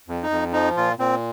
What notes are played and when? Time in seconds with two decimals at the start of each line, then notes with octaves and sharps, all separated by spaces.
0.08 F2
0.23 D#4
0.30 F2
0.53 F3 D#4
0.76 A#2 F4
0.99 A#2 C4